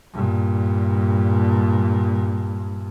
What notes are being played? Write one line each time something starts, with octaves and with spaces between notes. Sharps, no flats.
G2 A#2